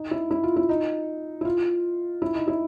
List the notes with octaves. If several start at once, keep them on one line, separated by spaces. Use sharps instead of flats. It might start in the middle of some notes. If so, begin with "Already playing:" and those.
Already playing: D#4
E4
E4
F4
E4
D#4
E4
F4
E4
D#4
E4